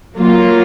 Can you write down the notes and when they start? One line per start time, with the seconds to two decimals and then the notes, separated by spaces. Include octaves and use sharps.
0.17 F#3 A#3 F4